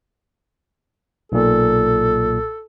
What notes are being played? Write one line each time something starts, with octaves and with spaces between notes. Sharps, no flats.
B1 A#2 A4